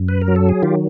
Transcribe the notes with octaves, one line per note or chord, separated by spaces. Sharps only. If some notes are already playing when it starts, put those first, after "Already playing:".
Already playing: F#2
B4
A#4
F#3
A4
G#4
D#3 F4 G4